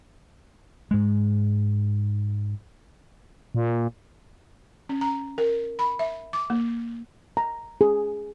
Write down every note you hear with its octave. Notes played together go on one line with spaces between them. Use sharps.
G#2 G#3
A#2
C#4
A#5
A#4
B5
E5
D6
A#3
A#5
G#4